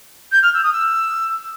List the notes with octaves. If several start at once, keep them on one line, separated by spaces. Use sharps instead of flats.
G6
F6
E6
D#6
E6